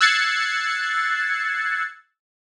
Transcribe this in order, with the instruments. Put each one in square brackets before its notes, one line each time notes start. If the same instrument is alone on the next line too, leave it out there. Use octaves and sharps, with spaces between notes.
[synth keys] E6 F#6 G#6 A6 C7 C#7